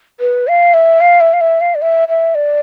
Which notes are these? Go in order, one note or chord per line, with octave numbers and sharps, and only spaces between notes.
B4
F5
E5
F5
E5
F5
E5
F5
D5
E5
E5
D5